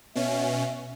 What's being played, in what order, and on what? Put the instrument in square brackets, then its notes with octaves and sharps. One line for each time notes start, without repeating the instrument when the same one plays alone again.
[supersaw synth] B2 C#4 [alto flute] E5